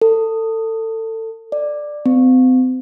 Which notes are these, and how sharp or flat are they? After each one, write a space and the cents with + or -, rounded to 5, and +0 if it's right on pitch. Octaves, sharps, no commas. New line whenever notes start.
A4 +25
D5 +10
C4 -40